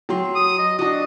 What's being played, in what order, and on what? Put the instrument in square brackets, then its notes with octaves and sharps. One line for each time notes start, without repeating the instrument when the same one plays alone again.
[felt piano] F#3 G5 C6
[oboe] D#6
D#5
[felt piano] D4 F#4 [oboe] D#5